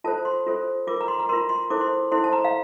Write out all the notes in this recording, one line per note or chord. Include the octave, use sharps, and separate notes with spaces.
F4 A4 C5 A5
C6
F4 A4 C5
F4 A#4 D6
A#5
C6
A#5
F4 A#4 C6
C6
E4 A4 C5 D6
C6
E4 A4 C5 C6
A5
A#5
F5